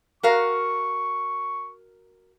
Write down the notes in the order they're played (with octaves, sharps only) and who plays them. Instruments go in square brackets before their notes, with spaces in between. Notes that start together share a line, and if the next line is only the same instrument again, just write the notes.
[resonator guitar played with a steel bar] F#4 A#4 F5 [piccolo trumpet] C#6